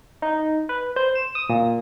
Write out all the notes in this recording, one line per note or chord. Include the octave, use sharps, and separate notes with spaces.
D#4
B4
C5
E7
D#6
A#2